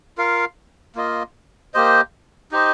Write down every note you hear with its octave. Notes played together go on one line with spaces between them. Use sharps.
F4 A#4 F5
A#3 F4 D#5
A#3 G4 C5 D#5
D#4 G4 C5 D#5